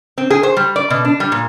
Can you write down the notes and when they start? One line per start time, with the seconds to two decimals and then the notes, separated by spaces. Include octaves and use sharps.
0.18 C4
0.30 G#4
0.43 C5
0.57 G3
0.76 D5
0.90 B2
1.05 D4
1.20 G3
1.32 A#2